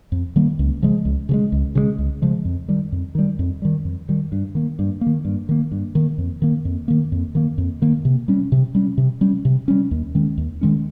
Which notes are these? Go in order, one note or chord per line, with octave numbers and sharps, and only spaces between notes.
F2
D#3 G3 A#3
C#2
C#3 F3 G#3
C#2
C#3 F3 G#3
C#2
C#3 F3 G#3
C#2
C#3 F3 G#3
F2
D#3 G3
F2
D#3 G3
F2
D#3 G3
F2
D#3 G3
G2
D#3 A#3
G2
A#3
D#3
G2
D#3 A#3
G2
D#3 A#3
F2
D#3 A#3
F2
D#3 A#3
F2
D#3 A#3
F2
D#3 A#3
C3
G3 C#4
C3
G3 C#4
C3
G3 C#4
C3
G3 C#4
D#2
D#3 G#3 C#4
D#2
D#3 G#3 C#4